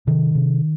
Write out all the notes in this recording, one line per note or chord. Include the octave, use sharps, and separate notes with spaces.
C3 D#3
C3